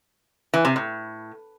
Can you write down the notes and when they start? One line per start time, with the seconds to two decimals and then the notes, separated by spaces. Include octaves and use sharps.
0.54 E3
0.65 C3
0.76 A2